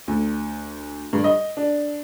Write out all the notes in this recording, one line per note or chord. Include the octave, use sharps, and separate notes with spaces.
D2
G2
D#5
D4